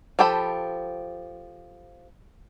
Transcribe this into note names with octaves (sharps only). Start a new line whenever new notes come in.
F3 G4 A4 G5 B5